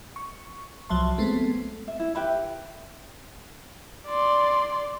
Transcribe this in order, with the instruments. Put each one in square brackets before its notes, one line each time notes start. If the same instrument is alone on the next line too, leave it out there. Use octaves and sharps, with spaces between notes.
[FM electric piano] C#6
C2 F3 F#3 E5 A5 C6
G#3 A3 B3 C4 A4
[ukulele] E5
E4
G4 B4 E5 B5
[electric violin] D5 C6